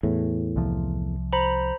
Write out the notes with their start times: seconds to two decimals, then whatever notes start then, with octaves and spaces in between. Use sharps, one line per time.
0.03 E2 A2
0.56 C2 C3 F3
1.33 C5 A#5 B5